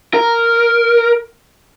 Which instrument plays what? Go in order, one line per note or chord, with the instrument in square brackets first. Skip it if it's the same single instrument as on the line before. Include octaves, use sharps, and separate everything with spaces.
[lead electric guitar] A#4